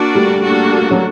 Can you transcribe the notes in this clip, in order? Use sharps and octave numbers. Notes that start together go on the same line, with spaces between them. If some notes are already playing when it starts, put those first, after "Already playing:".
Already playing: A#3 D4 F#4 A#4 D5
G3 A3
A#3 D4 F#4 A4
F#3